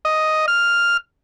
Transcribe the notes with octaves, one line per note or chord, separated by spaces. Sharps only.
D#5
F6